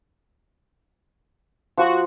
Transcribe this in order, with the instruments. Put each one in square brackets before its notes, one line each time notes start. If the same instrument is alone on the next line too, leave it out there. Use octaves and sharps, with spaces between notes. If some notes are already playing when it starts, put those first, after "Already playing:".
[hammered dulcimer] F3 [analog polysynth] F#4